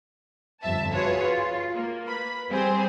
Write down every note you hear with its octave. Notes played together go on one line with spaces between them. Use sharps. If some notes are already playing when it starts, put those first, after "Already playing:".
G1 F2 E5 A5
F4 F#4 G#4 B4 C#5
F4
A#3
B4 B5
G3 C4 G4 G#4 C5